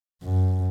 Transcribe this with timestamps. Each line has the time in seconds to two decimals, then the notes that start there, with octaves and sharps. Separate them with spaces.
0.23 F#2